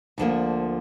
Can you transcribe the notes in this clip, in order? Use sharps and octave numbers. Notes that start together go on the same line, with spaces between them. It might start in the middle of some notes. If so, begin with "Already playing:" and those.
D2 D3 F3 A#3